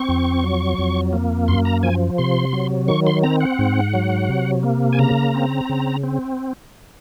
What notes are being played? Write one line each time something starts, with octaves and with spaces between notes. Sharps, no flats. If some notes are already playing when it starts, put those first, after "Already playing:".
Already playing: C4 C#6
F2
F#3
F2
A#3
F#2 C6
A#5
F3 G#5
C3 C6
F#3
D#3 C#6
C6
C4 A#5
F#5
G#2
F#3
C3
A#3
G#5
C#3 A#5
C4
C#3
C4